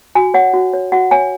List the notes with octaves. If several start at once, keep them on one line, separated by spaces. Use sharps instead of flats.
F#4 G#5
C#5 F#5
F#4
C#5
F#4 F#5
C#5 G#5